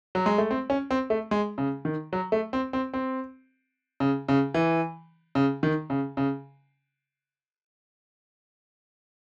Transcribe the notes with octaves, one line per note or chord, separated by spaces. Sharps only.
F#3
G#3
A3
C4
C#4
C4
A3
G#3
C#3
D#3
F#3
A3
C4
C4
C4
C#3
C#3
E3
C#3
D#3
C#3
C#3